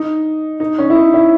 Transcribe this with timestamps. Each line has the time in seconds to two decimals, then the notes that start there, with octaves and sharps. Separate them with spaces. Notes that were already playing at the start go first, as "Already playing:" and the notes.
Already playing: D#4
0.60 D#4
0.78 C#4
0.90 E4
0.96 D#4
1.14 E4